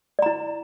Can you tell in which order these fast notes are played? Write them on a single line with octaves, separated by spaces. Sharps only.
D5 A#5 E4